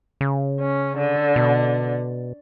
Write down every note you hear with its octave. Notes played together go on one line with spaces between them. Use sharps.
C#3
C#4
D3
B2